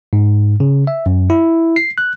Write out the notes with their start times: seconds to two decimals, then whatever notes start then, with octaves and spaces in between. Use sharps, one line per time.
0.13 G#2
0.60 C#3
0.87 E5
1.06 F#2
1.30 E4
1.76 C7
1.98 F#6